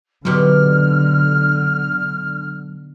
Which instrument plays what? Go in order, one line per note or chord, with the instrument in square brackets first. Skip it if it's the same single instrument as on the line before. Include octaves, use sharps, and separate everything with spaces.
[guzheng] G#2 B2 G4 [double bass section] D3 [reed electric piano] F#3 [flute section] F6